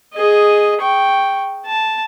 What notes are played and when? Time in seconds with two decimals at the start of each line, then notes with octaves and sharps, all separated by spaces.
0.14 G#4 D#5
0.81 G5 C#6
1.66 A5